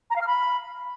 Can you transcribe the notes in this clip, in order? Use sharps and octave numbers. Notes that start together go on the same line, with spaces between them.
A#5
F5
F6
B5